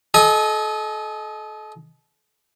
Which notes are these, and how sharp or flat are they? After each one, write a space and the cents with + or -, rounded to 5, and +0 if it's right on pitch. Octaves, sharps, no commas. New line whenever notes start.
A4 -35 D#5 +5 G#5 -10